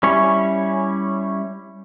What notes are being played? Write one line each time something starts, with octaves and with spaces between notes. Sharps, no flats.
G3 C#4 E4 C#5